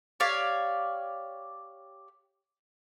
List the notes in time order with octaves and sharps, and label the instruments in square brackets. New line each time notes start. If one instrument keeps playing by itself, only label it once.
[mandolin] G4 C#5 D5 F5